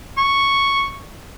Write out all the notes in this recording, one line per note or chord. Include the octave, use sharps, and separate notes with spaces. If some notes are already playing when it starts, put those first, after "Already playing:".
C#6